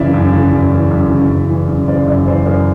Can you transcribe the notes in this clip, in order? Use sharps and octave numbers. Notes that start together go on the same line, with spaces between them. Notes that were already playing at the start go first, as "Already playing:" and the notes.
Already playing: F#2 C#3 E3 D5 E5
F#2
C#3
F#2
E3
F#2
C#3
F#2
E3
F#2
C#3 C5 D5
F#2 D5 E5
E3 C5 D5
F#2 A#4 C5